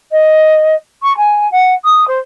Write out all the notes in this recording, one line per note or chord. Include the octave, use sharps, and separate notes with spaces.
D#5
C#6
G#5
F#5
D#6
C5